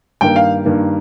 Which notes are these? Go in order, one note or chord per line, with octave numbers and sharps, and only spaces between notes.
G2 D#3 A#3 G5
F5
G2 D#3 A#3